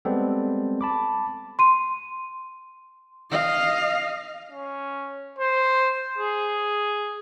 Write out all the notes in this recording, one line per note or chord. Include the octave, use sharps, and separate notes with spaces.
G3 G#3 B3 C4 A4
A5 B5 D6
C6 D#7
D#5 F5
C#4
C5
G#4